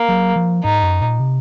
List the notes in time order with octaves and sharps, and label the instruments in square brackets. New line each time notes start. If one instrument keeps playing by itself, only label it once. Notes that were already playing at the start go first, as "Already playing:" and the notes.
Already playing: [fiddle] A#3
[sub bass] F#3
F3
[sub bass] G#2 [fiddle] D#4
[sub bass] F#2
A#2
C3